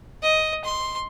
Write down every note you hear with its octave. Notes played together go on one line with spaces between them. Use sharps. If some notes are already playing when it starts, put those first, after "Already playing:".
D#5
C6